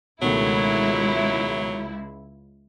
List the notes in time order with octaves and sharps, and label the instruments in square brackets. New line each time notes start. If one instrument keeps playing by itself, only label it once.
[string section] C#2 [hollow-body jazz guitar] B2 D#3 A3 [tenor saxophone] F#3 [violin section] E4